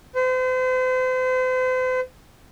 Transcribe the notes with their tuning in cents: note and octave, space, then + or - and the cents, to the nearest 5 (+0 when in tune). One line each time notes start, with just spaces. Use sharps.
C5 -40